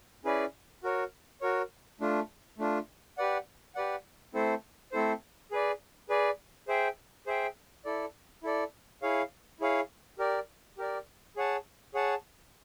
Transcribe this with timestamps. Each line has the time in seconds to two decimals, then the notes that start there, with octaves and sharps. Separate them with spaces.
0.25 C#4 E4 G#4 B4 D5
0.83 F#4 A#4 C#5
1.41 F#4 A#4 C#5
2.01 A3 D4 F4
2.58 A3 D4 F4
3.18 G4 B4 D5 F#5
3.75 G4 B4 D5 F#5
4.34 A3 C4 E4 A4 C5
4.92 A3 C4 E4 A4 C5
5.51 G#4 B4 D5
6.09 G#4 B4 D5
6.68 G#4 C5 E5 G5
7.27 G#4 C5 E5 G5
7.85 E4 A4 D5
8.43 E4 A4 D5
9.02 E4 G#4 C#5 F5
9.60 E4 G#4 C#5 F5
10.19 G4 A#4 D5
10.78 G4 A#4 D5
11.36 G#4 C#5 F#5 A5
11.94 G#4 C#5 F#5 A5